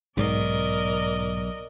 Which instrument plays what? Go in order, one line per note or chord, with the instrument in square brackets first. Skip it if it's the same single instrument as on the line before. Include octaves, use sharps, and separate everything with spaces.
[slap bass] B1 B2 [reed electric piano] G#2 [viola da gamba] A#4 D5 D#5